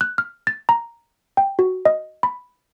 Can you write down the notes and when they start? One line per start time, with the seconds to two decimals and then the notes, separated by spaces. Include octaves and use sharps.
0.01 F#6
0.18 F6
0.47 A6
0.69 A#5
1.37 G5
1.59 F#4
1.85 D#5
2.23 B5